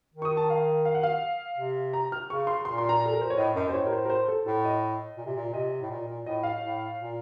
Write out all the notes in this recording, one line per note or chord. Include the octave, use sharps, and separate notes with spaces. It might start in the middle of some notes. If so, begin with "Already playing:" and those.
D#3
C#6
D#6
A5
F5
F5
F#5
F5
C3
A#5
F6
C#3 C#6
C6
A#2 C6
C6
A#5
A4
A#4
C5
C#5
A2 D#5
F#2 D#5
F#2 C5
A2 C#5
A#4
C5
A#4
C5
A4
A2 A4
D#5
A#2
C3
A#2
C3 D#5
A2
A#2
A#2
A2 D#5
F5
A2
A#2